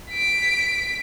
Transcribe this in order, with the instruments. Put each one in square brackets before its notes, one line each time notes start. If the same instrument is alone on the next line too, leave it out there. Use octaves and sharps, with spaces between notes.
[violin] B6 D7